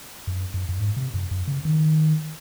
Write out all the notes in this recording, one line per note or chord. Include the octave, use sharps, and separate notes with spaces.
F#2
F#2
F#2
G#2
C3
F#2
F#2
C#3
D#3